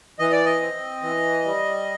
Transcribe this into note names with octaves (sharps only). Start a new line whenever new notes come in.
E3 D#5
D5
D#5
C4
E3
G3